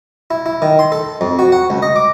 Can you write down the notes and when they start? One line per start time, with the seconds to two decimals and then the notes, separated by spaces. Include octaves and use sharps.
0.31 E4
0.46 E4
0.62 D#3
0.79 C6
0.92 A4
1.21 F2
1.39 F#4
1.52 F#5
1.70 C#2
1.82 D#5
1.96 D6